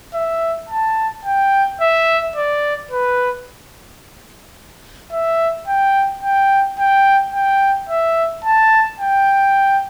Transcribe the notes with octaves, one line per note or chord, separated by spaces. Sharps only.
E5
A5
G5
E5
D5
B4
E5
G5
G5
G5
G5
E5
A5
G5